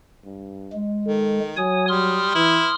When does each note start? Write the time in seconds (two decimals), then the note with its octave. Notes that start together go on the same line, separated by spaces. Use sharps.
0.25 G2
0.73 G#3
1.06 D#3 A4
1.57 F#3 C#5 G#5 D#6
1.88 G3 C6 D#6 F6
2.35 E3 E4